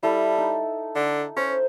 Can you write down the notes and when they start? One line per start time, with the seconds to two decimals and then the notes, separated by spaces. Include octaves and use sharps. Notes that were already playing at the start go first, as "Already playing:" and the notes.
0.03 G3 E4 A4
0.38 D#4
0.95 D3
1.37 C#4 C5